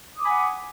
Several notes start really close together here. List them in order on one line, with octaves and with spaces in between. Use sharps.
D#6 D6 G#5 B5 F#5